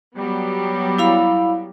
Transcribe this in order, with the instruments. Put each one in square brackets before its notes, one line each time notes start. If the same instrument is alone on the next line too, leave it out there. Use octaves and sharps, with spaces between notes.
[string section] F#3 G3 B3
[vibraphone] E4 F5 B5